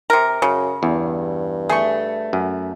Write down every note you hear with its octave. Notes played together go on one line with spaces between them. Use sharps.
C3 A#4
F#2 C#3
E2 G2
A3 G#4 C#6
F#2